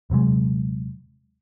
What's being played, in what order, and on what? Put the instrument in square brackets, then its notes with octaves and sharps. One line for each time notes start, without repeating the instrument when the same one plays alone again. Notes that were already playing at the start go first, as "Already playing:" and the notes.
[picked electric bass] D#1 C3 F#3 G#3